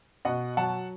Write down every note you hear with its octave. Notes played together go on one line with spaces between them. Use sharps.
B2 D#5 F#5
F#3 F#5 A5